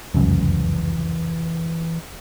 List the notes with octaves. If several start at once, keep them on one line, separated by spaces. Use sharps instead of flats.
F1 C#2 F#2 E3